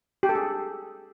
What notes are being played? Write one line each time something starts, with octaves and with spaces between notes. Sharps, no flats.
G4
A4
G#4